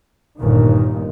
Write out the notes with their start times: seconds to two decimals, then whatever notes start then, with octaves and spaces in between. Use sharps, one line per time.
0.38 G1 D#2 A#2 D#3